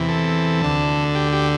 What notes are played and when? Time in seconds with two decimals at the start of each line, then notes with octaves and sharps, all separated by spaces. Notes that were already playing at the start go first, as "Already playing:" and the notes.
Already playing: E2 C3 E3
0.09 A4
0.62 D2 D3
1.15 G4
1.32 G4